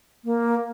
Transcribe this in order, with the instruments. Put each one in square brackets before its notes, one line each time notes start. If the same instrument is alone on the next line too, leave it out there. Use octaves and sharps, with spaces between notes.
[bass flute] A#3